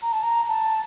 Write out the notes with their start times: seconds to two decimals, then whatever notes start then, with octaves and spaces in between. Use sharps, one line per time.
0.02 A#5
0.12 A5
0.23 A#5
0.49 A5